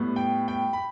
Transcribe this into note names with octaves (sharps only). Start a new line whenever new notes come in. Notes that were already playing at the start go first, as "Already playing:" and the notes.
Already playing: A2 G3 B3
G5
G5
B5